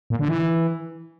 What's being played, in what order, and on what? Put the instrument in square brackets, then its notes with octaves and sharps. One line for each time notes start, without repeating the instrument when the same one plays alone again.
[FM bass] A#2
D3
E3